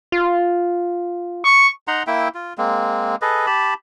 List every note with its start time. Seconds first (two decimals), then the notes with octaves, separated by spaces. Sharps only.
0.12 F4
1.45 C#6
1.88 D#4 F#5 A#5 C6
2.07 A#3 E4 E5 G5
2.34 F4
2.58 G#3 A#3 C4
3.22 G#4 A4 B4 D#5
3.47 G4 A5 B5